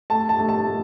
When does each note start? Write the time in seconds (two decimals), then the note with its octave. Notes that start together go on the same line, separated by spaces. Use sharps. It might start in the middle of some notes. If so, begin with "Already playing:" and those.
0.10 A3 A5
0.29 A5
0.39 A3
0.49 A5
0.68 A3